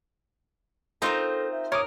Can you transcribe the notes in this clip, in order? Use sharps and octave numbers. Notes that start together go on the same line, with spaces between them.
C4 D#4 F4 A4 A#4 C5 A#5
E5
A#4 C#5 D6 D#6